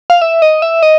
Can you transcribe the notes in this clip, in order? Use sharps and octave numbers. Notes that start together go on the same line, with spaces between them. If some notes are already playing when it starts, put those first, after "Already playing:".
F5
E5
D#5
E5
D#5